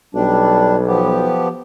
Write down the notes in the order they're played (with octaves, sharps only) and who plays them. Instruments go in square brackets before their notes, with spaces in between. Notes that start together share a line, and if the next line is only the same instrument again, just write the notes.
[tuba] B1 [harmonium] G3 D4
[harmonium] F3 B3 G4